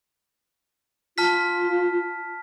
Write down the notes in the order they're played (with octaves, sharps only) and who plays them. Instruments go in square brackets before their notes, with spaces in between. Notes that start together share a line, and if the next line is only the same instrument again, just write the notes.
[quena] F4 [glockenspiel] A5 F6 B6